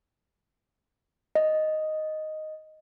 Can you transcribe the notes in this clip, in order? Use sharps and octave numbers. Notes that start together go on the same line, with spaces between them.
D#5